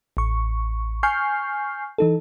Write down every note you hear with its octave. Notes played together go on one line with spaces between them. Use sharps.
A1 C#6
G#5 C#6 F6 G6 C7
E3 D#4 A4